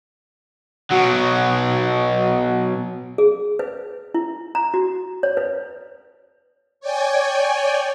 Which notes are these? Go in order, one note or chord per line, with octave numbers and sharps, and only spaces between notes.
B2 F#3 F#4
G#4
B4
E4
A#5
F#4
C#5
B4
C#5 D5 G5 G#5